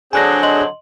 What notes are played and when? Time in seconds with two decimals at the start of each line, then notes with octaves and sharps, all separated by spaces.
0.13 D3 F#3 C4 D4 G#4 G#5 F#6 A#6
0.43 D#5 C6 F#7